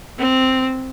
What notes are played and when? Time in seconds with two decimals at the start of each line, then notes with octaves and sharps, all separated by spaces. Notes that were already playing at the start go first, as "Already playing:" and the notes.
0.18 C4